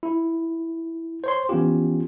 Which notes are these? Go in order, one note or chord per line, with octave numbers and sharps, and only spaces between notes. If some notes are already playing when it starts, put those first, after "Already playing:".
E4
C5 C#5 C6
E3 B3 C#4 F4 G4